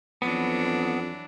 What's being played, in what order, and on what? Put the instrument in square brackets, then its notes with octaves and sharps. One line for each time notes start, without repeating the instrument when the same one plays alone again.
[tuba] F2 [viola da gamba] E3 F#3 D4 [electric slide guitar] B3